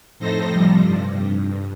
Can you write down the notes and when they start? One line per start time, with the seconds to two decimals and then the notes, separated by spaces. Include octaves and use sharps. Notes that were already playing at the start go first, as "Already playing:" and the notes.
0.19 F2 A2 D#4 A4 C5 A#6
0.50 C3 F3 G3
0.81 G2